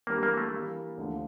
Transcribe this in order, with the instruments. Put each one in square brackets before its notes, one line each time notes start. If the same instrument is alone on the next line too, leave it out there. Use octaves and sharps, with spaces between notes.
[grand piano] E3 G3 D4 G4 A#4 [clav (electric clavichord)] A#3
[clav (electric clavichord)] A#3
A3
[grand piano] E3 G3 A#3
D2 D3 F3 A3